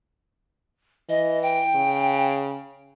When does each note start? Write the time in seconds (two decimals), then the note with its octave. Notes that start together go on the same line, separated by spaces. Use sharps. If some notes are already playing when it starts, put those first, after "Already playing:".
1.09 E3 D#5
1.42 G5
1.75 C#3